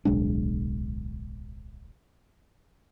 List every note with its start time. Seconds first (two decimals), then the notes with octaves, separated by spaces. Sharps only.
0.05 D1 B1 G#3 D4